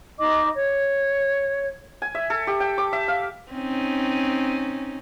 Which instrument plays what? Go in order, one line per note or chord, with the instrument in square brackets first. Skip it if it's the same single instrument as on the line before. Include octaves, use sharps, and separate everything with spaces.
[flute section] D#4 D#5 D6
C#5
[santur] G#5
E5
A4
G4
G5
D6
E5
F5
[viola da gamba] C4 C#4 D#4